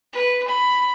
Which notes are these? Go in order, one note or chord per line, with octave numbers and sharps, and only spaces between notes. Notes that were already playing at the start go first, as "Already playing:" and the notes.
B4
B5